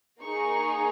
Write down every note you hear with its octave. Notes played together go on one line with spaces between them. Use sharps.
A#3 D#4 G#4 C#6